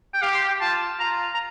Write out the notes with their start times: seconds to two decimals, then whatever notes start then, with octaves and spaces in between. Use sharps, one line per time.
0.14 G5
0.22 G4 F5
0.34 C6
0.48 G5
0.61 F4 A5
1.00 F4 A#5
1.34 A#5